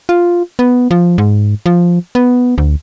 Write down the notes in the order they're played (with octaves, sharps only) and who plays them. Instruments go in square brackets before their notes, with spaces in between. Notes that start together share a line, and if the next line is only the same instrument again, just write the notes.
[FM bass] F4
B3
F3
G#2
F3
B3
D2